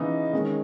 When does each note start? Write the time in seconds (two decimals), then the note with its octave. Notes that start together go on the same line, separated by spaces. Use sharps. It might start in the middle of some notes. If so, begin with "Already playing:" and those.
Already playing: C#3 E3 B3 D#4
0.33 D#3 G#3 C#4